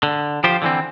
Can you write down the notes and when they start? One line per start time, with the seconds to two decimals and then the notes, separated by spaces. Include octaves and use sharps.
0.03 D3
0.44 F3 F4 G4 C5
0.62 D3 E3 C4